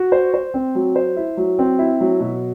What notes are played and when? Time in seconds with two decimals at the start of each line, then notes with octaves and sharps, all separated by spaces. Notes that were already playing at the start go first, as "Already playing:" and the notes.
Already playing: F#4
0.12 C5
0.34 C5
0.54 C4
0.75 F#3
0.96 C5
1.16 E4
1.37 F#3
1.59 C4
1.79 E4
2.01 F#3
2.20 B2